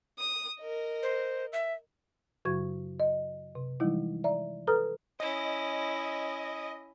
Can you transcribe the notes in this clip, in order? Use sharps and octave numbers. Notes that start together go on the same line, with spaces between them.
D#6
A#4 D#5
C5
E5
F#2 C#3 F#3 F#4 C#6 G#6
D#5
C3
E3 F3 G3 G#3 D#4 E4
D5 E5 A#5
A4 B4 A#5 D#6 F6
C#4 E4 D#5